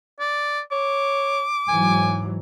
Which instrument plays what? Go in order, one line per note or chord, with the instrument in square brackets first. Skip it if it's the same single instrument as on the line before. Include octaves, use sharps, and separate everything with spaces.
[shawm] D5
[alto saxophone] C#5 [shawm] D6
[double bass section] G#2 E3 F#3 [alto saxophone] G#5